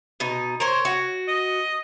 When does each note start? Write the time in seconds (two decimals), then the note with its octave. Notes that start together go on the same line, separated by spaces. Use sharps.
0.20 B2 D#4
0.60 A#4 C5 C#5
0.85 F#4
1.28 D#5